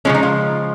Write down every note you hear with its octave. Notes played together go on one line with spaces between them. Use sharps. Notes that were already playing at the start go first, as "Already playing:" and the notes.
C#3 F3 G#3 C#4
D#4
F4